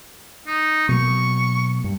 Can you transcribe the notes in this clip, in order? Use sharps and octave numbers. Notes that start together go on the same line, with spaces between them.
D#4
B2 F#3 A#3 C#6
G2